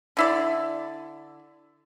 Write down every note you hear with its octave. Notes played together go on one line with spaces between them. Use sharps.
D3 E4 D5